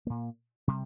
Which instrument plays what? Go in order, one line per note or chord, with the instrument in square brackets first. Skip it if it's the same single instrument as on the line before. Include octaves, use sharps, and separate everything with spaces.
[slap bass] A#2 A#3
C3 G3